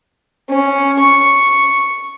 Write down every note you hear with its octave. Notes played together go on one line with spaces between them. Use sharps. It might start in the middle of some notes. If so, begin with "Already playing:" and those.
C#4
C#6